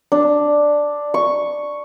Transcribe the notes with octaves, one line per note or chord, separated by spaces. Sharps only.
D4
C#6